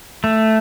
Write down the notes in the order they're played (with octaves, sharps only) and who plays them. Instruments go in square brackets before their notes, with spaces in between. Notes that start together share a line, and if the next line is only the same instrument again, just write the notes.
[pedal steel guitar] A3